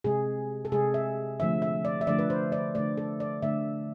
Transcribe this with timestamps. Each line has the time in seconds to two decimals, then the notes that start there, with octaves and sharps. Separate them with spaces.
0.04 C3 G#3 G#4
0.65 A4
0.72 C3 G#3 G#4
0.94 E5
1.40 D3 F3 A3 E5
1.62 E5
1.85 D5
2.01 E5
2.07 D3 F3 A3 D5
2.19 B4
2.30 C5
2.52 D5
2.75 D3 A3 D5
2.97 A4
3.20 D5
3.42 D3 A3 E5